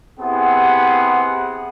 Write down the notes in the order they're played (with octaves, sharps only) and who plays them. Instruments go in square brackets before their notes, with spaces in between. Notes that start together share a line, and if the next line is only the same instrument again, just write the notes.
[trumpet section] B3 C4 E4 G4 G#4 F#5